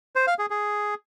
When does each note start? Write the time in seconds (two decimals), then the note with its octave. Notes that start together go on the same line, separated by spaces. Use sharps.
0.16 C5
0.27 F5
0.39 G#4
0.50 G#4